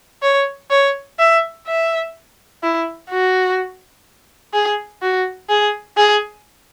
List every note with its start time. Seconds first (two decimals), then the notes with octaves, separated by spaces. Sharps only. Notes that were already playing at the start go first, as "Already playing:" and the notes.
0.23 C#5
0.71 C#5
1.19 E5
1.67 E5
2.63 E4
3.10 F#4
4.53 G#4
5.02 F#4
5.49 G#4
5.97 G#4